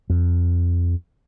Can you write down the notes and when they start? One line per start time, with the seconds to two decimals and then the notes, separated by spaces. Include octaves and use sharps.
0.10 F2